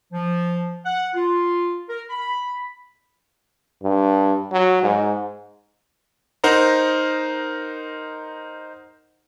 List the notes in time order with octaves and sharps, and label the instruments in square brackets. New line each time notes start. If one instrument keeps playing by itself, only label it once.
[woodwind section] F3
F#5
F4
A#4
B5
[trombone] G2
F#3
G#2
[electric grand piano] D#4 A#4 C5 F#5 A#5